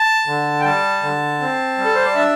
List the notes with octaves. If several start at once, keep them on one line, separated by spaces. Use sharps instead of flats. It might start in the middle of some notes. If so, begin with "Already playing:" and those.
Already playing: A5
D3
G5
G3 A5
D3
C4
G3
A4
C5
D5
D4 E5